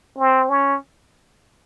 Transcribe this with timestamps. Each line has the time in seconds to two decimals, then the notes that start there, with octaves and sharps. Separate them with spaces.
0.19 C4
0.50 C#4